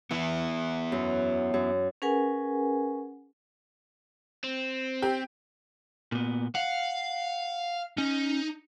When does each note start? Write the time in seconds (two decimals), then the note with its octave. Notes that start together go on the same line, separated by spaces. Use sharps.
0.11 E3 B3 E4
0.92 F#2
1.54 F#2
2.02 C#4 G#4 A#4 B4 F#5 G#5
4.44 C4
5.02 G4
6.12 A#2 B3
6.55 F5 F#5
7.98 C#4 D#4